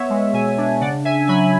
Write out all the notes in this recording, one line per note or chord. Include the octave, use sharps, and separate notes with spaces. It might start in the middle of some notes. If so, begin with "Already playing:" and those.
Already playing: B3 C#5 E5
G#3
B2 E5 G#5
D4
C#3 D5 F#5
C#3 E5 G#5
F#3 G#5 B5